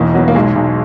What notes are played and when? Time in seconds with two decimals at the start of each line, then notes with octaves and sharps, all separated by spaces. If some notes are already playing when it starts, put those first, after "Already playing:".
Already playing: E1 E2 A#3 D#4
0.14 F#3 B3
0.28 A#3
0.35 B1 G#3
0.56 B1